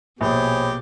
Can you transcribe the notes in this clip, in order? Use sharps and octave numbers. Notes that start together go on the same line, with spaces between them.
A#1 B2 G4 G#4 C5 C#5 B5